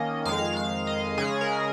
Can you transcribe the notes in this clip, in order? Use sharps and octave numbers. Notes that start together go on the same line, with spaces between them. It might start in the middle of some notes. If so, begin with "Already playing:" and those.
Already playing: D#3 A#3 C#4 D#5
F2 D#3 G#3 F5
F5
D#5
C#3 G#3 C#4 G#4
A#4